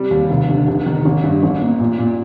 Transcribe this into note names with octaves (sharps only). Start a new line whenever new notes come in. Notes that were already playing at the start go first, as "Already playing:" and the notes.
Already playing: C3 G3
D#2
F1
D3
F1
D#3
A1
G2
A1
A#3
A#2
A#2